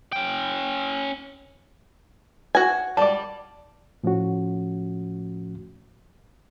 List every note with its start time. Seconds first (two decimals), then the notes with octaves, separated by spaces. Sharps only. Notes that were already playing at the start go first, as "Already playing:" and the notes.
0.12 C#4 G5
2.55 F#4 G#5
2.97 G3 D5 A5
4.03 A2 F3 A3 C#4 F#4